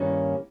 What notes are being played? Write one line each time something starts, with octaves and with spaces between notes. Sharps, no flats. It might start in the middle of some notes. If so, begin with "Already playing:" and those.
Already playing: G2 D#3 G3 A#3 C#4